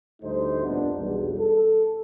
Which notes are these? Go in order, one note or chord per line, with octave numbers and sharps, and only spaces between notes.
D2 A2 G3 A3 D#4 C5
F2 A#2 G3 B3 D4
B1 E2 G3
A4